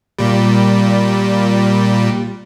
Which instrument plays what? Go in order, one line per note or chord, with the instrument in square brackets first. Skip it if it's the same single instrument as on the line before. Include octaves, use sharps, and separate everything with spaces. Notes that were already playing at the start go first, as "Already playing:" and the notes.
[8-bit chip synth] A#2 G3